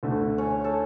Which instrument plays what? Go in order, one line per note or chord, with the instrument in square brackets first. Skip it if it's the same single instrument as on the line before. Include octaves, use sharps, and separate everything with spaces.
[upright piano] D2 D3 A3
[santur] C#4 C#5
A4